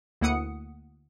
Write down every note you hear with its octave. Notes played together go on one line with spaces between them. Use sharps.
D2 A#3 E4 F#5 D#6 C#7